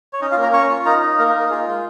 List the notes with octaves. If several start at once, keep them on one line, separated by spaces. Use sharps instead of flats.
C#5
C#4 D#4 D#5
F4 F5
A#3
A#4 A#5
C#4 C#5 C#6
F4
D#4 A#4 A#5
D#4
A#3 A#4 A#5
A#4
D#4
A#4
F4 G#4
G#3